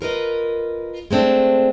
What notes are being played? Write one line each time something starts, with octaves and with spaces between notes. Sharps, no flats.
F4 A#4 B4 D#5
G#3 A3 C4 D4